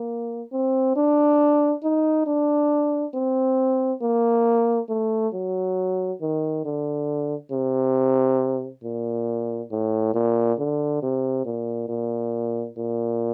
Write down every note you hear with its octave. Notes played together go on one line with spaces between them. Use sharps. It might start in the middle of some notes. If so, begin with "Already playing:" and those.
Already playing: A#3
C4
D4
D#4
D4
C4
A#3
A3
F#3
D#3
D3
C3
A#2
A2
A#2
D3
C3
A#2
A#2
A#2